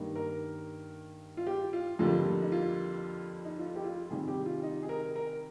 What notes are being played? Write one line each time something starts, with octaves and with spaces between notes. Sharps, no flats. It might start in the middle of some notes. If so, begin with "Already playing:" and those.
Already playing: G2 D#3 A#3
A#4
F4
G4
F4
F2 D3 G3 A#3 F4
D#4
F4
D#4
F4
G4
F4
C3 D#3 G3 G#4
G4
F4
D#4
G#4
A#4
A#4